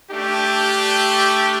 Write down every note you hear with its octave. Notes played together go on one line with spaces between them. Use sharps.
A3 D4 G4